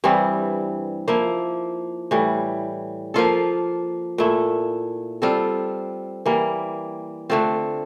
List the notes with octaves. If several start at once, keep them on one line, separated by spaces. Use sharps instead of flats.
G2 E3 G3 C4
F3 A#3 E4
A2 E3 G3
F3 A#3 F4 A4
A#2 A3 E4
G3 C4 F4 A4
E3 G3 A#3
D3 A3 C4 F4